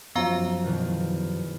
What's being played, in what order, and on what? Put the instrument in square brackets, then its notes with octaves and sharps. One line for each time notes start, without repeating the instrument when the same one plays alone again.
[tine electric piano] F#2 F3 F#3 [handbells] B3 F5 A#5
[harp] E2 B2 D#3